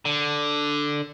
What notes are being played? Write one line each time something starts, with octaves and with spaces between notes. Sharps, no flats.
D3